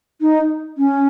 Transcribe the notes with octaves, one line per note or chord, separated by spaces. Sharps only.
D#4
C#4